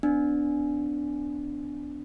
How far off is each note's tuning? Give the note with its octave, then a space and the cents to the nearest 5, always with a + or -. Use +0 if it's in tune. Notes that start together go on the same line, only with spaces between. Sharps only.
B3 +40 D4 +0